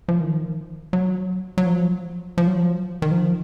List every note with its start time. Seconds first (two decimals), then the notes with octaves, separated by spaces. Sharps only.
0.08 F3
0.20 D#3
0.93 F#3
1.58 F#3
1.66 F3
2.38 F3
2.47 F#3
2.56 F3
3.02 D#3
3.11 F3